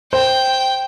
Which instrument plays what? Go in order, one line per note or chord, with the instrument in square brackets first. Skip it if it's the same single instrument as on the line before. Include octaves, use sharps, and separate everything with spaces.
[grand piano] C5 [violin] G5